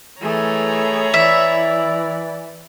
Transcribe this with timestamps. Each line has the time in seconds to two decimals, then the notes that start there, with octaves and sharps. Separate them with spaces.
0.21 E3 A3 G#4 C#5 A#5 B5
1.14 E3 E4 D5 E5